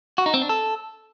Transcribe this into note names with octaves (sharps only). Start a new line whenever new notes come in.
F#4
D#4
C4
D4
A4